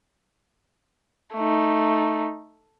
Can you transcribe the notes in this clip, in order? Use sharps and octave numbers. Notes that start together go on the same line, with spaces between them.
A3 D#4